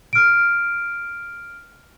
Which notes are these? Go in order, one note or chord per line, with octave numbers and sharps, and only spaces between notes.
F6 D7